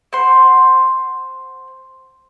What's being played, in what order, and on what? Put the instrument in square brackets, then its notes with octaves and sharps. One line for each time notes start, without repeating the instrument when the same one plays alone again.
[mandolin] C5 F#5 C6